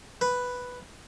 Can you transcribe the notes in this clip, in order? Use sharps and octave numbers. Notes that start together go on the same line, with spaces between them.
B4